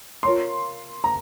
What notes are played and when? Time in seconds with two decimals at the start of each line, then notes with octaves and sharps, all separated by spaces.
0.23 F4 A#4 C#5 F5 C6
1.04 A#5